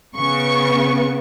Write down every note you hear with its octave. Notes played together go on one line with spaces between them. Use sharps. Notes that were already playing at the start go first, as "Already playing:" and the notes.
C#3 B3 C#6